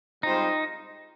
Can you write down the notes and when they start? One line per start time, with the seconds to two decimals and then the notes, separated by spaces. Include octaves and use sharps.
0.23 G#2 G3 C4 D#4 F4 C5